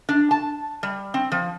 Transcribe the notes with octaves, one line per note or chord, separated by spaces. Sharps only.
D4
A5
G3
C4
F3